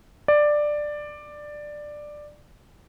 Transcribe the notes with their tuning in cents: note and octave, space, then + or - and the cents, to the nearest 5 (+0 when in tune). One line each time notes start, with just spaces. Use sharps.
D5 +10